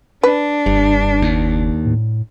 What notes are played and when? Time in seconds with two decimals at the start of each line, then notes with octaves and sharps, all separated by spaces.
0.23 D4 B4
0.66 F#1 G2
1.22 D#2
1.85 A2